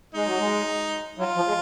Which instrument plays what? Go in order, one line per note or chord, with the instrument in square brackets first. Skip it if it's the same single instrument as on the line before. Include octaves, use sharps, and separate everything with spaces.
[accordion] G#3 [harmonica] D#4
[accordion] F#3
G#3
[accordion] F#3 [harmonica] F4
[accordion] F3
G#3